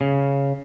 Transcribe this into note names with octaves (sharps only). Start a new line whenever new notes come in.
C#3